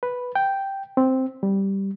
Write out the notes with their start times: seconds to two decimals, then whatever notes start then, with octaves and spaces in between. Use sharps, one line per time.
0.03 B4
0.35 G5
0.97 C4
1.43 G3